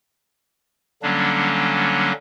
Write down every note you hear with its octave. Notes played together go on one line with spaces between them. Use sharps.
D3 F#3 G3 A#3 C#4 D4